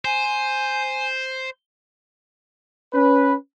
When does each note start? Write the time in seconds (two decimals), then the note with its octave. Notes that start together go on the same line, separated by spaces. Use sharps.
0.05 C5 G#5
2.93 C#4 B4